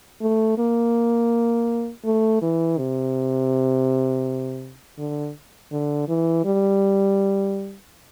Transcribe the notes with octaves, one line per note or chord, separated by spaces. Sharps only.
A3
A#3
A3
E3
C3
D3
D3
E3
G3